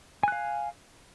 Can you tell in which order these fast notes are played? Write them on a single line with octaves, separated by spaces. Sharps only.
G#5 F#6 F5